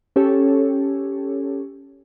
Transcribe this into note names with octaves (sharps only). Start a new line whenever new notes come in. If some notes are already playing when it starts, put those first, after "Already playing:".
C#4 G4 A4 C#5